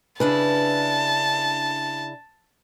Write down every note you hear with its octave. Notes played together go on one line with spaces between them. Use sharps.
C#3 D4 E4 B4 A5